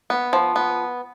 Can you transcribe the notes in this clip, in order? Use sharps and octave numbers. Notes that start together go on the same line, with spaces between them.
B3
F3
B3